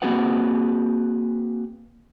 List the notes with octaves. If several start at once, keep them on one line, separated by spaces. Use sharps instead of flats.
A#3 C4 F#4 G#4 B4 F#5